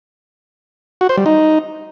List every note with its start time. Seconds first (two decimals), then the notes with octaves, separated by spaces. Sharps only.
1.01 F#4
1.09 C5
1.17 G3
1.26 D#4